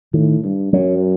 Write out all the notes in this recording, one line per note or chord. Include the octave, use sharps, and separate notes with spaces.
A2 D#3
G2
F#2 F#3